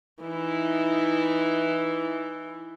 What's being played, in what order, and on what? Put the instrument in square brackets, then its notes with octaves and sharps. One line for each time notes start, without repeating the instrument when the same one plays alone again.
[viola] E3 [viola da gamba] D#4 E4